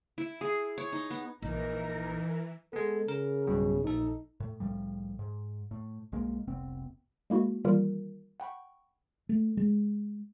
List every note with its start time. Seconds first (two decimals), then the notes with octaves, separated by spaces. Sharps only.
0.18 E4
0.41 G#4
0.78 C#5
0.92 D#4
1.10 B3
1.42 A#1 E3 D#4 A#4
2.73 G#3 B3 A4
3.08 C#3 A#4
3.47 B1 G2 B2
3.84 A#1 D#4 A4
4.40 A2
4.60 C2 A2 F3 G3
5.19 G#2
5.71 A2
6.12 B1 G#3 A#3
6.48 F1 C2 B3 C4
7.30 G#3 A#3 E4 F#4
7.65 D#3 E3 G3 A#3 F4 A#4
8.40 F#5 G5 B5 C#6
9.29 A3
9.57 G#3